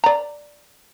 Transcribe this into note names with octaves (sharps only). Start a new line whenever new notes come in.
D5 A#5